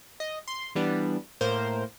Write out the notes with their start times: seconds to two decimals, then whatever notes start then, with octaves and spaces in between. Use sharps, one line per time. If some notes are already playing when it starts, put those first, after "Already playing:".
0.20 D#5
0.48 C6
0.75 E3 G3 B3 D4
1.41 A2 A#3 A#4 C5